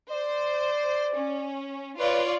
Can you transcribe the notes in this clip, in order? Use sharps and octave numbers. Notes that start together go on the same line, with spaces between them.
C5 D5
C#4
F4 B4 C#5 D5